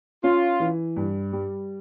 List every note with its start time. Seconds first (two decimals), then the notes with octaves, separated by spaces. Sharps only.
0.24 C#4 F4
0.60 E3
0.96 G2
1.33 G3